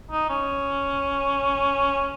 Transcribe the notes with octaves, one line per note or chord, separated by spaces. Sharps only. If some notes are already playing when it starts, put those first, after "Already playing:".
D#4
C#4